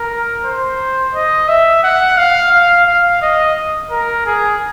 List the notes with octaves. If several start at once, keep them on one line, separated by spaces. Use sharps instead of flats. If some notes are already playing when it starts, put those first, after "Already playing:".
Already playing: A#4
C5
D#5
E5
F#5
F5
F5
F5
D#5
A#4
G#4